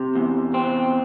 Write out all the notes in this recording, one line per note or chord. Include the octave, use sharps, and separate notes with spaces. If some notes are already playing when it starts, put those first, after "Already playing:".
Already playing: C3
E2
C4